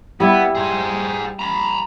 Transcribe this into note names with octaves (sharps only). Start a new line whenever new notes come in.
G3 B3 E4
G#4 C5
A#5 B5